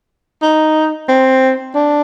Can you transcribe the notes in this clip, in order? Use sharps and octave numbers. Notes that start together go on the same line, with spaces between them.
D#4
C4
D4